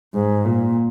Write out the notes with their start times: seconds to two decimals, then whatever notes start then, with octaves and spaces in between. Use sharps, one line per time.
0.14 G#2
0.46 A#2